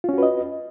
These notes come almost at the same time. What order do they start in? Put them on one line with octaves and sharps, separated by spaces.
F4 C#4 F#4 B4 D#5